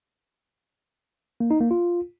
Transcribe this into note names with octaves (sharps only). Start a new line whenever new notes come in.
A#3
D#4
A#3
F4